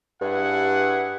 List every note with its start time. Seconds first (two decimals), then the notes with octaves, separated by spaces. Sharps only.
0.21 G2 E4 G#4 F#5